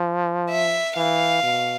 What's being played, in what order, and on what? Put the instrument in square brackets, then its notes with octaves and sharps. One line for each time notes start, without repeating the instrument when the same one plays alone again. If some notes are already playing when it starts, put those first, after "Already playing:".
Already playing: [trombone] F3
[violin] E5
[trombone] E3 [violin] F5
[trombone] B2